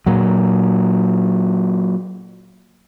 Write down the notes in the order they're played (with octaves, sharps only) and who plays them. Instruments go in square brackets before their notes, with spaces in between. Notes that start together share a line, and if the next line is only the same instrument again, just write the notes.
[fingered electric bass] A#2 F#3